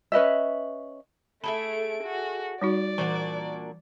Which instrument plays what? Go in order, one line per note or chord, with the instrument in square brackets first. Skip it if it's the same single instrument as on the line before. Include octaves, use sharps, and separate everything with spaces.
[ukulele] C#4 B4 D#5 E5
[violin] A3 D7 [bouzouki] E4 G#4 A4 [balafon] B5
[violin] F#4
[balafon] G3 D#4 F#4 [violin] D5
[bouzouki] A#2 D4 F#4 [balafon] E3